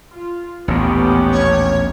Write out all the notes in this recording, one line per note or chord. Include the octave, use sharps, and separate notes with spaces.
F4
A1 D#2 A#2 B3 C#4 G4
C#5